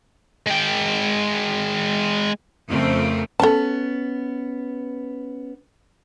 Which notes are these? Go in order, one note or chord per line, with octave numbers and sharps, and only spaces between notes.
G#3 G5
F2 C#3 A3 C4 A#4
B3 C#4 A4 A5